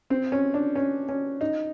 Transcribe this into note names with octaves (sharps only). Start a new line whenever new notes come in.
C4
C#4
D4
C#4
C#4
D#4